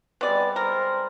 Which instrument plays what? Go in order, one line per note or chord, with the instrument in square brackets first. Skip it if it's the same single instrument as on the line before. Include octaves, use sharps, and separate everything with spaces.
[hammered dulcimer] G3 G#3 C4 [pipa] B3 D5
[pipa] A#4 [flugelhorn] C5